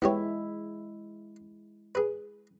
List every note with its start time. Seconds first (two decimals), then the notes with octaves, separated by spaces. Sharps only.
0.02 G#3 B3 E4 G4 C#5
1.95 G#4 B4